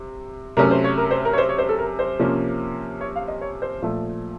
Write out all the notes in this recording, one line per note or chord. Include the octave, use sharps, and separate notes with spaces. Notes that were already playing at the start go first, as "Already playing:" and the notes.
Already playing: C3
C3 F#3 A3 C#4 A#4
C5
C#5
A#4
C5
A#4
C#5
C5
C#5
C5
A4
A#4
C5
C3 F3 A#3 C#4
C#5
F5
D#5
C#5
C5
A#2 F3 A3